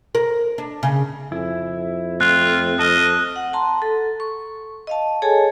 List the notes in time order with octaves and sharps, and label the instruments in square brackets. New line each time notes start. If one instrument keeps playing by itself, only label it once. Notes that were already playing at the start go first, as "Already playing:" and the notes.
[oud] A#4
D4
C#3
[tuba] F2 [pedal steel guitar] E4
[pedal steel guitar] A3 C4 [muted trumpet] F4 [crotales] F#6
[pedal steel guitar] A4 F6 [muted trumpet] D#5
[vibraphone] F#5
A5 A#5 C6
A4
C#6
D#5 F5 A5
G#4 A4 C#5 G#5 A5